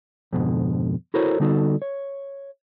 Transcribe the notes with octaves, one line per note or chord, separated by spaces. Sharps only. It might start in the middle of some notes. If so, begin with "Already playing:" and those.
F2 G#2 B2 D3
E4 F#4 A4 A#4 C5 C#5
D3 G3 B3 D#4 F#4 A4
C#5